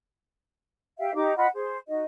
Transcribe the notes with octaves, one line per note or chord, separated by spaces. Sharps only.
G4 E5 F5 G5
D#4 G4 D6
F4 D#5 F#5 B5
G#4 C5
D#4 F#4 D#5